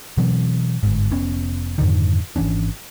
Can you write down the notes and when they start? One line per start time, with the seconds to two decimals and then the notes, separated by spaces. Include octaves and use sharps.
0.17 B2 E3 F#3 C4
0.83 G1 G#2
1.11 F1 B3 C#4
1.78 F2 G#2 D3 D#3
2.36 G#1 E3 C#4 D4